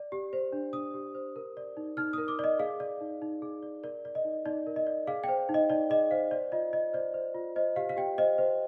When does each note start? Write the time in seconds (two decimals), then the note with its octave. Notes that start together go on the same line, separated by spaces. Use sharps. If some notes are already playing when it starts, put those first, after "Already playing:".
Already playing: D5
0.12 G4
0.33 C5
0.52 D4
0.73 D4 D#6
0.94 G4
1.14 C5
1.36 A#4
1.57 D5
1.77 D#4
1.97 D#4 F6
2.13 A#4 D#6
2.28 D6
2.39 D5
2.44 D#5
2.59 G#4 F5
2.80 D5
3.01 D#4
3.22 D#4
3.42 G#4
3.63 D5
3.83 A#4 D5
4.05 D5
4.15 D#5
4.25 D#4
4.46 D#4 D5
4.67 A#4
4.76 D#5
4.87 D5
5.07 G#4 F5
5.24 C5 G5
5.49 D#4
5.54 D#5
5.70 D#4 D5
5.90 G#4 D#5
6.11 C5 F5
6.31 C5 D5
6.52 F4 D#5
6.73 F4 D#5
6.93 C5 D5
7.14 C5
7.35 F4
7.56 C5 D#5
7.76 G4 F5
7.89 F5
7.97 G4 G5
8.18 C5 D#5
8.38 C5